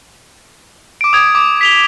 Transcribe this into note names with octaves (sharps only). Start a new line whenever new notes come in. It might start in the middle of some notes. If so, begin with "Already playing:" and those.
D6 D7
D#6 G#6
D6
B6 F7 G7